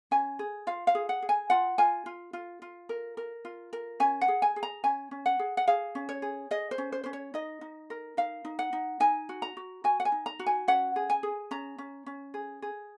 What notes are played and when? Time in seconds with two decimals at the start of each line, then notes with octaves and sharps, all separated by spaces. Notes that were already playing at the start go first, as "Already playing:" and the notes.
0.11 C#4 G#5
0.39 G#4
0.67 F4 F5
0.87 F5
0.95 G#4
1.09 F#5
1.22 G#4
1.29 G#5
1.50 F4 F#5
1.78 F4 G#5
2.06 F4
2.33 F4
2.62 F4
2.89 A#4
3.17 A#4
3.45 F4
3.73 A#4
4.00 C#4 G#5
4.21 F#5
4.28 G#4
4.42 G#5
4.56 G#4
4.63 A#5
4.84 C#4 G#5
5.11 C#4
5.26 F#5
5.39 G#4
5.57 F#5
5.67 G#4 F5
5.95 C#4
6.09 C#5
6.22 G#4
6.51 G#4 D#5
6.71 C5
6.78 C#4
6.92 C5
7.04 C#4 C5
7.13 C#5
7.34 D#4 D#5
7.61 D#4
7.90 A#4
8.17 D#4 F5
8.45 D#4
8.59 F#5
8.73 D#4
9.00 D#4 G#5
9.29 F#4
9.42 A#5
9.57 F#4
9.84 F#4 G#5
10.00 F#5
10.05 G#5
10.12 D#4
10.26 A#5
10.39 F#4
10.46 G#5
10.68 C#4 F#5
10.96 G#4
11.10 G#5
11.23 G#4
11.51 C#4 A#5
11.78 C#4
12.06 C#4
12.34 G#4
12.62 G#4